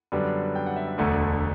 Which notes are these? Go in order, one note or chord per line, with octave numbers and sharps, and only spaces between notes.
F#2 D3 G3 B3 D4
G5
F#5
E5
E5
E1 D2 D3 A3